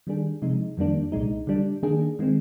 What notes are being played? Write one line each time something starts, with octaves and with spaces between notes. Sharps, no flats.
D#3 G3 D4 G#4
C3 F3 G#3 D#4
F2 D#3 G3 A#3 D4
C2 A#2 G#3 D#4
D3 G3 D4
D#3 A#3 D4 G#4
D#3 G#3 C4